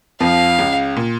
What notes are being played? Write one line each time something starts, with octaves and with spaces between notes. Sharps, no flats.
F2 F3 F5
C#2 C#3
A#2